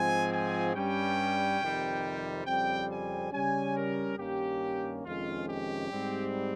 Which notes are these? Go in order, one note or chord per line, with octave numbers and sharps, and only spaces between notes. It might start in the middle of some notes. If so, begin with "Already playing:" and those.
Already playing: G#2 F3 C4 G#5
G#5
G2 G3 C#4 G5
F2 C3 D#3 G3
F2 C#3 G3 C4 G5
G#5
C#3 G3 C#4 G#5
A#4
G2 D#3 A#3 C#4 G4
F2 C3 D#3 G#3 C#4 F4
G4
G#2 G3 C4